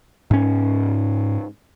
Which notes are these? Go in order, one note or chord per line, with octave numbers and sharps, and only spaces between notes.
G#2 C#4